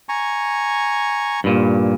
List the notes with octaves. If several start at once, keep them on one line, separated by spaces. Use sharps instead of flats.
G#5 A#5 C#6
G2 A#2